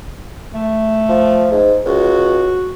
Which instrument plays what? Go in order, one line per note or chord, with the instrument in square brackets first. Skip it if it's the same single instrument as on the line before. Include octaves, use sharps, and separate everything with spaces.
[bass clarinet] A3
[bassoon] F3
G#2
[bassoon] C#2 [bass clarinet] F#4